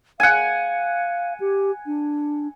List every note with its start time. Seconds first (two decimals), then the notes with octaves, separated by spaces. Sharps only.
0.20 F5 F#5 G#5
1.40 G4
1.86 D4